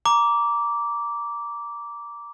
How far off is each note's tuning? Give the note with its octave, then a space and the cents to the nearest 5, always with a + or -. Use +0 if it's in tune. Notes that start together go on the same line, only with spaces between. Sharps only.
A#5 +10 D6 -10